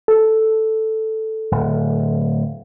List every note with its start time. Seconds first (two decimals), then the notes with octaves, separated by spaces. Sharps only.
0.08 A4
1.51 D1